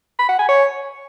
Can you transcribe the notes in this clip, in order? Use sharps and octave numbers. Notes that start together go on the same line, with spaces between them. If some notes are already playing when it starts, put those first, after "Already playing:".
B5
F#5
G#5
C#5